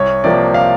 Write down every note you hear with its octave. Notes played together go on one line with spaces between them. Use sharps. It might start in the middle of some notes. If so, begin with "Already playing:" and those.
Already playing: C2 C#5
C3 F3 A#3 D5
F5